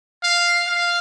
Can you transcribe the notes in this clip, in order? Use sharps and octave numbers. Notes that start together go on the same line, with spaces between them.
F5
F5